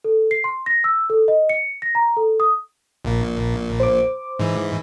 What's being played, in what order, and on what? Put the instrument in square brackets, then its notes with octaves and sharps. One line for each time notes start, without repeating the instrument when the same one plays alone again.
[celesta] A4
C7
C6
A#6
E6
A4
D#5
C#7
A#6
A#5
A4
D#6
[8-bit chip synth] A#1 A#2
[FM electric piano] C5 D6
[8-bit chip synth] G#2 E3